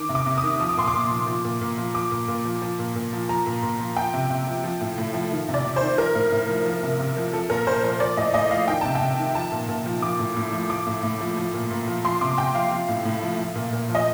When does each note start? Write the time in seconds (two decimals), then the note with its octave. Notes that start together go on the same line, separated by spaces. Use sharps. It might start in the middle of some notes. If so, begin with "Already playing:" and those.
Already playing: D#3 D6
0.09 C3
0.15 D6
0.26 C3
0.37 D#6
0.43 D#3
0.60 F3 D#6
0.69 D6
0.77 A#2 C6
0.88 D6
0.94 A#2
1.11 F3
1.27 F3
1.45 A#2
1.61 A#2
1.78 F3
1.94 F3 D6
2.11 A#2
2.28 A#2
2.45 F3
2.62 F3
2.79 A#2
2.96 A#2
3.13 F3
3.29 F3 A#5
3.46 A#2
3.63 A#2
3.80 F3
3.97 F3 G5
4.13 C3
4.30 C3
4.47 F3
4.64 F3
4.81 A2
4.98 A2
5.14 F3
5.32 D#3
5.48 C3
5.54 D5
5.65 C3
5.76 C5
5.82 D#3
5.98 F3 A#4
6.15 A2
6.32 A2
6.48 F3
6.66 F3
6.83 C3
6.99 C3
7.17 F3
7.33 F3 A4
7.50 A#2 A#4
7.67 A#2 C5
7.83 F3 C5
8.00 F3 D5
8.17 A2 D#5
8.34 A2 D#5
8.51 F3 F5
8.68 D#3 G5
8.81 C3 A5
8.95 G5
9.01 C3
9.18 D#3
9.35 F3 A5
9.52 A#2
9.69 A#2
9.86 F3
10.02 F3 D6
10.19 A2
10.36 A2
10.53 F3
10.70 F3 D6
10.87 A2
11.03 A2
11.21 F3
11.37 F3
11.54 A#2
11.71 A#2
11.87 F3
12.04 F3 C6
12.21 C3 D6
12.37 C3 G5
12.55 F3 F5
12.71 F3
12.89 A2
13.05 A2
13.22 F3
13.39 F3
13.56 A#2
13.73 A#2
13.90 F3
13.95 D#5